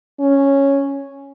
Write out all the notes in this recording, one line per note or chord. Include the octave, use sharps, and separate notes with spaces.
C#4